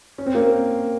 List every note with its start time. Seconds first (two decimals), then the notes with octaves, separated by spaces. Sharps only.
0.18 C#4
0.26 C4
0.35 A#3